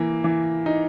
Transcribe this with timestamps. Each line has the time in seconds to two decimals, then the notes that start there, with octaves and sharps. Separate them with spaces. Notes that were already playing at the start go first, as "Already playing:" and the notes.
Already playing: E3 A#3
0.24 E3
0.66 D#4